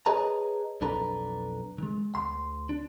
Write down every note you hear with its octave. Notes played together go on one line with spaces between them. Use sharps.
G#4 B4 C#5 D#5 A5 A#5
B1 F2 D4 A4 B4 A#5
D#3 G#3
D2 C6
D4